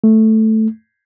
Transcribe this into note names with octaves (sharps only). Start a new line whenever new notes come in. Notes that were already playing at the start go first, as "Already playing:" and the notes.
A3